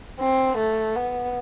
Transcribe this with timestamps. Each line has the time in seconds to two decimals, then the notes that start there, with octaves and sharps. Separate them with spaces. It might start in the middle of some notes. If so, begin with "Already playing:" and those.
0.20 C4
0.58 A3
0.96 B3